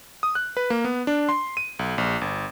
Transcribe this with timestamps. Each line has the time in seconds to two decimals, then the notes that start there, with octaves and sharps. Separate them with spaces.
0.23 D#6
0.35 F#6
0.57 B4
0.70 A#3
0.84 B3
1.07 D4
1.29 C6
1.57 D#7
1.79 B1
1.98 A#1
2.21 G1